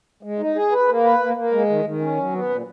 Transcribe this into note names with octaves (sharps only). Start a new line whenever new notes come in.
G#3
D#4
G#4
B4
A#3
B4
A#3
A#3
G#3
D#3
D#3
C#4
F#3
B3
A#2